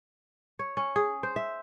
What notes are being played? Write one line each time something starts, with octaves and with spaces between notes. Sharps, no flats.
C#5
C#4
G#4
C5
E5